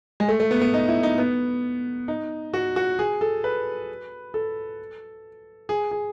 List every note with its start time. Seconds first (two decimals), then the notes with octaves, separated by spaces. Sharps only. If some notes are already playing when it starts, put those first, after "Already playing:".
0.20 G#3
0.29 A3
0.40 A3
0.51 B3
0.61 B3
0.74 D#4
0.89 E4
1.03 D#4
1.18 B3
2.08 D#4
2.54 F#4
2.76 F#4
2.99 G#4
3.21 A4
3.44 B4
4.34 A4
5.69 G#4
5.91 G#4